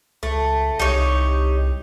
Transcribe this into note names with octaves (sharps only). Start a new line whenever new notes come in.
C#2 A3
C2 D#4 G4 C#5